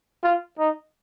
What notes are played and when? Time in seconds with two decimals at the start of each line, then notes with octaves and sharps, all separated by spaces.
0.23 F4
0.58 D#4